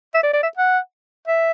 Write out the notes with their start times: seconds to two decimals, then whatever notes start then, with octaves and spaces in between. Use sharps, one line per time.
0.14 E5
0.23 D5
0.33 D5
0.43 E5
0.57 F#5
1.27 E5